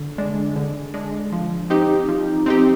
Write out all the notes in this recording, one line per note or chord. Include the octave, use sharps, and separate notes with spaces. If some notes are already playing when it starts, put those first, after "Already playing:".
Already playing: D3
G#3 D4
D3
G#3 D4
F3
C4 D#4 G4
F3
C4 D#4 G4